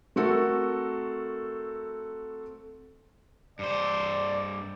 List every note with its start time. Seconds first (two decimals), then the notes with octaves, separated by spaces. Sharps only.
0.16 A3 C4 F#4 A4 A#4
3.59 G2 C5 D5